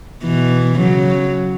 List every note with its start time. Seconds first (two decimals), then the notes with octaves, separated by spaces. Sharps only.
0.24 B2 E3
0.78 C#3 F#3